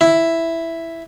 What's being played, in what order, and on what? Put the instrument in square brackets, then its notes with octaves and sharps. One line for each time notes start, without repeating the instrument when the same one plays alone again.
[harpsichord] E4